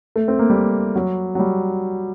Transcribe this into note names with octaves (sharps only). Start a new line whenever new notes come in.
A3
C4
A#3
G3
F#3
F#3
G3